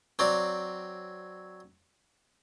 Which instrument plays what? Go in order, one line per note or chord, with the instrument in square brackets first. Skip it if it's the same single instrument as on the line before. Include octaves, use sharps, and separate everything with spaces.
[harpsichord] F#3 C4 D5